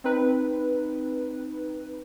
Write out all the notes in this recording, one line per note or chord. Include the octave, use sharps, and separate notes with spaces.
C4 D#4 B4